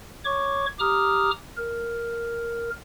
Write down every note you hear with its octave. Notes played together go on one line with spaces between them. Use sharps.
C#5 C#6 D6
G4 A#5 D6 D#6 F6
A#4